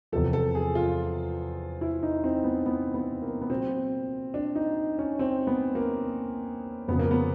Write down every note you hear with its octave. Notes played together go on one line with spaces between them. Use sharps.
E2 C3 F3 A4
A4
G#4
F4
E4
D#4
C4
B3
B3
B3
A#3
B3
A#2 F#3 C4
D4
D#4
C#4
C4
B3
A#3
F2 C#3 F3 B3
A#3
B3